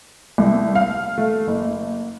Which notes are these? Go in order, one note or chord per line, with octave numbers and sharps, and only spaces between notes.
C2
F5
A3
F#1